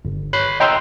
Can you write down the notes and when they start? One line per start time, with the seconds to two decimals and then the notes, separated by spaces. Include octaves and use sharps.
0.05 G1
0.33 C#5 B5 F#6 C7
0.60 D#5 G5 A#5 C6 E6